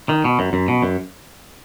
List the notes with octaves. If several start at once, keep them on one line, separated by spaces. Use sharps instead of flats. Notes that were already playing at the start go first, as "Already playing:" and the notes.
D#3
B2
F#2
F#2
B2
F#2